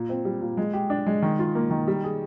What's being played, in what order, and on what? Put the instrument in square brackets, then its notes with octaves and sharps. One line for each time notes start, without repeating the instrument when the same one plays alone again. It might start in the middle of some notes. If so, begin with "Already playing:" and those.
Already playing: [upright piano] A#2
C4
G3
A#2
G#3
G4
D4
G#3
D#3
F4
A#3
D#3
G3
G#4